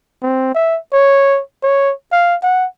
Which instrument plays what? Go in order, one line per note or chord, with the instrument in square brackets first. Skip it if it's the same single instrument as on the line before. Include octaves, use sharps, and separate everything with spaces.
[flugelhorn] C4
E5
C#5
C#5
F5
F#5